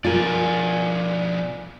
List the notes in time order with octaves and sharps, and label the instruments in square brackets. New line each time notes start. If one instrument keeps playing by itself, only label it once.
[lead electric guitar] B2 F3 [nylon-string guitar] F4 A#4 [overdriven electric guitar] D5 G#5